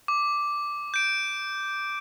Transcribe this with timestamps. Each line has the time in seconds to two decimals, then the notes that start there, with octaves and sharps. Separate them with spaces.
0.08 D6
0.94 G6 D7